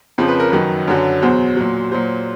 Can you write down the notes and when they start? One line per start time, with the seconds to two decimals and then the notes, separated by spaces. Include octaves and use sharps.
0.18 F2 C#3 F3 C5
0.28 B4
0.40 A#4
0.50 F#2 D#3 F#3 B4
0.87 F#2 D3 F#3
1.22 E2 B2 F#3 C5
1.57 A#2 F#3
1.92 A#2 F#3 C5